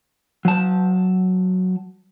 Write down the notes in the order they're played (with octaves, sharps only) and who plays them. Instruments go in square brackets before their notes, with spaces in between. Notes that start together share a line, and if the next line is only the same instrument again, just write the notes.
[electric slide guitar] F#3 A5